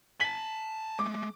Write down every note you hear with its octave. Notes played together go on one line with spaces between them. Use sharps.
G#5 A5 B6 F#7
G#3 A3 D6